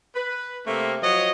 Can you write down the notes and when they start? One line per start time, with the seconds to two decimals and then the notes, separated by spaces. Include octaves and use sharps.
0.14 B4
0.65 C3 A3 A#3 C4
1.02 F3 F#3 C#5 D#5